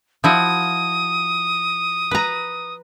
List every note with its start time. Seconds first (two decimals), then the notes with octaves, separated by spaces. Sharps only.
0.24 F3 E4 F#4 D#6
2.11 B4 A#5